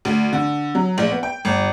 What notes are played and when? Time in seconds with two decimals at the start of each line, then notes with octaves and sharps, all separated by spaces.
0.05 D2
0.33 D3
0.75 F#3
0.98 A#1
1.11 B3
1.23 G5
1.45 G1